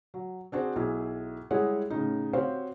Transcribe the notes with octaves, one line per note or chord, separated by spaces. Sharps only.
F#3
C4 D4 F#4 G#4 C5
B1 E4 G#4
G3 G#3 E4 G#4 C#5 F#5
A2 C#3 D#4
C4 F#4 G4 C5 C#5 F5